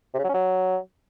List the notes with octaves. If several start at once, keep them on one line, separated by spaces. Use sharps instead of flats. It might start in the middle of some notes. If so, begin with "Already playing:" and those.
C3
C#3
F#3
C#4
F#3